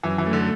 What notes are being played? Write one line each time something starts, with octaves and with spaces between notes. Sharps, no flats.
F#2 E3
E3
A3
D3